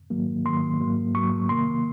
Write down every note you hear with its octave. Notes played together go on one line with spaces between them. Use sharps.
G#2 D#3 F#3 A#3
G#2 D#3 F#3 A#3 C6
G#2 F#3 A#3
G#2 F#3 A#3 C#6
C3 D#3 A#3 C6